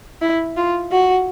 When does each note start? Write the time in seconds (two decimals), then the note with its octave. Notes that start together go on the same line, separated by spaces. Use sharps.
0.22 E4
0.57 F4
0.91 F#4